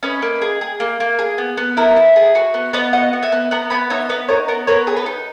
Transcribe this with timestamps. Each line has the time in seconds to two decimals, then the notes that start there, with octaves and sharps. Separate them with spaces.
0.03 C#4 B4 D#5
0.22 A#3
0.42 G#4
0.61 G#4
0.80 A#3
1.00 A#3
1.19 G#4
1.38 B3
1.57 B3
1.77 E4 A#4
1.96 E4
2.16 G#4
2.35 F#4 B4
2.54 B3
2.73 B3 B4 D#5
2.93 F#4 D#5 F#5
3.13 B3
3.23 E5 G#5
3.32 B3
3.51 B3 F#5 A#5
3.70 B3 G#5 B5
3.90 D#4 C#5 E5
4.09 B3 B4 D#5
4.28 D#4 A#4 C#5
4.48 B3 A#4
4.67 B3 A#4 C#5
4.87 G#4
4.96 B4 D#5
5.06 D#4